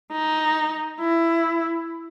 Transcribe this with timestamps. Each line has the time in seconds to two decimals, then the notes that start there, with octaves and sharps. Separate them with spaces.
0.12 D#4
1.00 E4